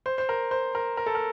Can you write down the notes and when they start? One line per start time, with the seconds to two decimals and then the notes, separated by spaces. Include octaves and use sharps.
0.06 C5
0.18 C5
0.29 A#4
0.51 C5
0.75 A#4
0.97 A#4
1.06 A4
1.15 A#4